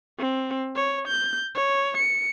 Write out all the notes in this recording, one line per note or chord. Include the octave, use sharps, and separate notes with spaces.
C4
C#5
G6
C#5
C#7